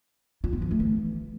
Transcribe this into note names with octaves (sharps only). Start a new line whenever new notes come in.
F4
B3
F3
A3
E3